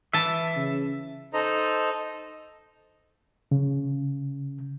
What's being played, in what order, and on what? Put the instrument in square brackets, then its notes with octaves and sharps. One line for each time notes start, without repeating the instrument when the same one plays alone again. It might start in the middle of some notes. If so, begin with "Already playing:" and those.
[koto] E3 A5 [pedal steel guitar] E5
[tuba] C#3
[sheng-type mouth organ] D#4 A4 C5 D#5 A#5
[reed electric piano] C#3